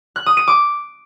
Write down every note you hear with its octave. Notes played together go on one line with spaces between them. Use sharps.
F#6
D#6
D#7
D6